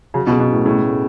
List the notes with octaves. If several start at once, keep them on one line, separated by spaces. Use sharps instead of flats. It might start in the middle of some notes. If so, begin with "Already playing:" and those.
C#3 F#3
B2
C#3
B2
A2 B3
A2 C#3
A3